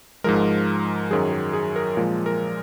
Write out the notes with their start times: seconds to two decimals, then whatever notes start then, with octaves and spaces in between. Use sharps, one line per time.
0.24 G#2 F3 G#3 A#4
1.11 F#2 D#3 F#3 G#4
1.33 G#4
1.54 G#4
1.76 A#4
1.97 A#2 F3 G#3
2.26 A#4